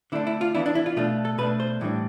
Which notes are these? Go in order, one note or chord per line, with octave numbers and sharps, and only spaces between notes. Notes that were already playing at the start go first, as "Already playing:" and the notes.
D3 A3 D4 E4
E4
F4
E3 B3 D4 E4
D4
E4
F4
B2 A3 D4 F4
A4
B2 A3 D4 B4
C5
A2 E3 G3 D4